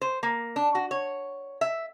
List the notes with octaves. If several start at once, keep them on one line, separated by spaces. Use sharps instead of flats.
C5
A#3
D4
F#4
C#5
E5